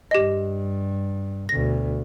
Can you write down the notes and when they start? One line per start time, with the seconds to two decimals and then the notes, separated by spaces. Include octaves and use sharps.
0.11 G2 G4 D#5
1.49 D2 B2 A#6